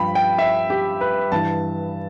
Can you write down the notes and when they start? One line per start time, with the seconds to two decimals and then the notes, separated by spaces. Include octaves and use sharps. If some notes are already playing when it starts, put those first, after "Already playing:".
Already playing: G2 F3 G5 B5
0.15 G5
0.38 E5
0.70 G4
1.01 B4
1.32 G2 E3 A5